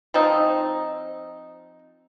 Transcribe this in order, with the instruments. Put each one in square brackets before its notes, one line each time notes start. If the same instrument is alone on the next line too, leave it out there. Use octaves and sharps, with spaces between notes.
[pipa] F3 C4 D#4